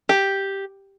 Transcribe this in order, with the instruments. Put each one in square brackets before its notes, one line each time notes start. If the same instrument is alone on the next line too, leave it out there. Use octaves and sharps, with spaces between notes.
[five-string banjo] G4